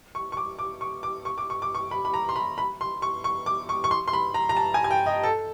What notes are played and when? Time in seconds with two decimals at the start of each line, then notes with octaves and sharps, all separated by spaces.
0.15 C#6
0.32 C#6
0.37 D6
0.59 D6
0.81 C#6
1.03 D6
1.25 C#6
1.38 D6
1.50 C#6
1.62 D6
1.75 C#6
1.91 B5
2.05 B5
2.14 A#5
2.29 C6
2.36 B5
2.58 B5
2.81 C6
3.02 C#6
3.24 C#6
3.46 D6
3.69 C#6
3.84 C#6
3.91 C6
4.08 C6
4.13 B5
4.34 A#5
4.49 A#5
4.57 A5
4.74 G#5
4.84 G#5
4.91 G5
5.06 D#5
5.23 A4